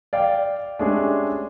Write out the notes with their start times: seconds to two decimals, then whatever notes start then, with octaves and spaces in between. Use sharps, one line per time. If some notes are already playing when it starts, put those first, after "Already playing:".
0.13 D5 F5 G5
0.79 G#3 A3 C#4 D4 G4 G#4